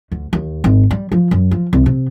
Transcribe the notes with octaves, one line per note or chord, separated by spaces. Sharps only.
D2
D#2
G#1
G3
F3
F#2
F3
C2
C3